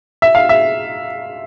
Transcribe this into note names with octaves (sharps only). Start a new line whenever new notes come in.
E5
F5
E5